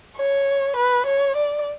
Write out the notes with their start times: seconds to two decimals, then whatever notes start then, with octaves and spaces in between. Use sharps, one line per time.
0.17 C#5
0.76 B4
1.06 C#5
1.36 D5